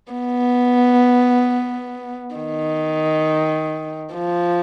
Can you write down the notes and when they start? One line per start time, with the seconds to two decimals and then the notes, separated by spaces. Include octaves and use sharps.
0.12 B3
2.36 D#3
4.15 F3